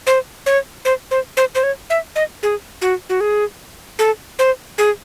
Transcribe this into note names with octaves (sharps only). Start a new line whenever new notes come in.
C5
C#5
C5
C5
C5
C5
C#5
E5
D#5
G#4
F#4
F#4
G#4
A4
C5
G#4